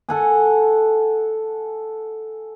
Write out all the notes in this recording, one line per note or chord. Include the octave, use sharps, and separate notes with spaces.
A4 F#5 G#5